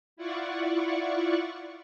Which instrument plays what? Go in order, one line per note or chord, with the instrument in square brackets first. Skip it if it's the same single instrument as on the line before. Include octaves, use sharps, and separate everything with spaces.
[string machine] E4 F4 D5 F#5 C#6